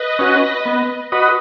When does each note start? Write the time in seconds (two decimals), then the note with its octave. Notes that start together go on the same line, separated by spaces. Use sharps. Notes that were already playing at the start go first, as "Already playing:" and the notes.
Already playing: B4 D#5
0.19 C#4 F#4
0.66 B3
1.12 F#4 B4 D#5